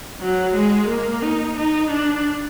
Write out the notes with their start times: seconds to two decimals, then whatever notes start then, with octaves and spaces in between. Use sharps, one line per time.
0.21 F#3
0.55 G#3
0.89 A#3
1.22 D#4
1.56 D#4
1.91 D4